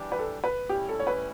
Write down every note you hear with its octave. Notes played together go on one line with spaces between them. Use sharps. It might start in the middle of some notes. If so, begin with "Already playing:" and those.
Already playing: E3 G3 D4 G4
B4
A4
B4
A2 G3 C#4 E4 G4
A4
C#5
B4